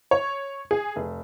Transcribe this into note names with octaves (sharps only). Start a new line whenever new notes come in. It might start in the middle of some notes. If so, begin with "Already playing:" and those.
C#5
G#4
F1